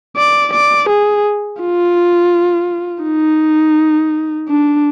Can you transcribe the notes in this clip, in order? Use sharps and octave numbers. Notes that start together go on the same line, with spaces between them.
D5
D5
G#4
F4
D#4
D4